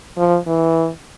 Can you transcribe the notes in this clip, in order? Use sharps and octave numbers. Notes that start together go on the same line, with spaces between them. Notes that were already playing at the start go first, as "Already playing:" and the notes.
F3
E3